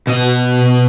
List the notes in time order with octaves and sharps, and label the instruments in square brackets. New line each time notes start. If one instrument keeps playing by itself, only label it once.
[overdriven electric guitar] B2 D#5